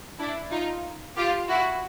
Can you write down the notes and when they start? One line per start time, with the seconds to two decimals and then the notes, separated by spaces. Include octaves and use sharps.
0.19 D4 E4
0.51 D#4 F4
1.16 F4 G4
1.49 E4 F#4